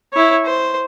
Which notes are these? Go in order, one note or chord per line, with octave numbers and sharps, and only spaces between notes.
E4 C#5
C5